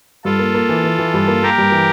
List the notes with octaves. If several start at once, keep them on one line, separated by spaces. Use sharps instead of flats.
G2 F4 A4
A#3
A#3
E3
E3
E3
G2
A#3
A#3 G4 A#4
G2
E3